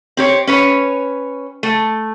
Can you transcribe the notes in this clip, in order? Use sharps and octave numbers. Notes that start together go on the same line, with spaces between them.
C4 G4 C#5
C#4 B4 C#5
A3